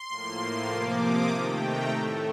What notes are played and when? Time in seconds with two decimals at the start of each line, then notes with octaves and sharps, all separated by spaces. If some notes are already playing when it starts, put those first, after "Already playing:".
Already playing: C6
0.09 A2 F3 A#3
0.69 C3 F3 A#3 D6
0.99 D#6
1.29 C3 D#3 A3 G5
1.59 A#5
1.89 A2 A3